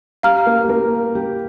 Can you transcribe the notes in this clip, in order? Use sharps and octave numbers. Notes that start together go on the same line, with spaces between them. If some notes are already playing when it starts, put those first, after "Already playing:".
G3 G4 F5 A#5 F6
A#3 A#4
G4
A#3 A#4
G3 G4